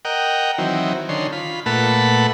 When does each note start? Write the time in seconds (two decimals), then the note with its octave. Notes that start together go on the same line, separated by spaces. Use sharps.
0.05 A#4 D#5 F#5 G5
0.58 D#3 E3 F#3 C4
1.09 D3 D#3 C#4 C6
1.32 F4 B5
1.66 A#2 A3 B4 F#5 A5 B5